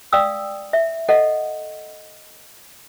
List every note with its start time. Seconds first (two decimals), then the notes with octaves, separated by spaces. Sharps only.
0.13 D5 F5 G5 D#6 E6
0.73 E5
1.09 A4 D#5 F#5